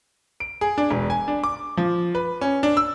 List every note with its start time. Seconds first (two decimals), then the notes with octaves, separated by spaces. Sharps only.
0.40 D7
0.61 G#4
0.78 D4
0.91 E1
1.10 G#5
1.28 D4
1.44 D6
1.77 F3
2.15 B4
2.41 C#4
2.63 D4
2.77 E6